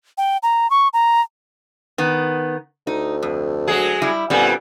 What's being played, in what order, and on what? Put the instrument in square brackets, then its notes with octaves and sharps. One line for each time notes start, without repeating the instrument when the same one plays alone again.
[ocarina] G5
A#5
C#6
A#5
[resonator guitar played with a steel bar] D#3 B3
[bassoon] D2 [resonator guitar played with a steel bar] D#4
[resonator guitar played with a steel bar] F2
[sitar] F#3 G#3 G#4
[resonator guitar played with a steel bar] G3 E4
[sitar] A#2 G3 [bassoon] D3 [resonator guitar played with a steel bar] B3 C4